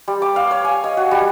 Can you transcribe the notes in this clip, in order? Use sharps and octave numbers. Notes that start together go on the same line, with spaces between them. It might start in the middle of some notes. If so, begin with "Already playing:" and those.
G3
D6
F5
C#5
G#5
D#5
F#4
G3